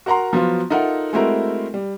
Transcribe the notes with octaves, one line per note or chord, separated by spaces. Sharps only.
F#4 A#4 F#5 A#5 C6
F3 F#3 B3 F4
D#4 F4 A4 A#4 E5 F#5
G#3 A3 C4 E4 F#4 A#4
G3